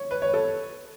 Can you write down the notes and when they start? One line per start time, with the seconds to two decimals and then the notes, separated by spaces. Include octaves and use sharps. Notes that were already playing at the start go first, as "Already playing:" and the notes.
Already playing: C#5
0.11 B4
0.22 C#5
0.34 A4